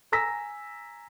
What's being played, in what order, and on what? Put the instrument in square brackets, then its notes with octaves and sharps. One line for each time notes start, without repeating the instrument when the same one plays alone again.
[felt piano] G#5 A#5 E6 A#6 B6